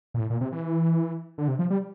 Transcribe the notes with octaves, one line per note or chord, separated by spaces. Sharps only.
A#2
A2
A#2
C3
E3
D3
C3
F3
G3